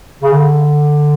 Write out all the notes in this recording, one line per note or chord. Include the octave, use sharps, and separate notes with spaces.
C#3
D3